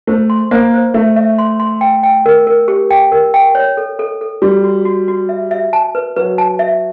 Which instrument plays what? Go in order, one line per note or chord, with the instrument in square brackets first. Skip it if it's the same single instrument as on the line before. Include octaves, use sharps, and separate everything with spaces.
[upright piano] A3 [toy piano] C5
[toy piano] C6
[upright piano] A#3 [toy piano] C5
[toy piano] C5
[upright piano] A3 [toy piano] E5
[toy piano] E5
C6
C6
G5
G5
A#4
A#4
G4
G5
A#4
G5
C#5
A4
A4
A4
[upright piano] G3 [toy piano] F#4
[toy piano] F#4
F#4
F#4
E5
E5
A5
B4
[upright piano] F#3 [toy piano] B4
[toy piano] A5
E5